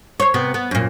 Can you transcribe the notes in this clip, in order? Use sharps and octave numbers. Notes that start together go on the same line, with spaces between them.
C5 C#5
C3 B3
B3
F#2 A#2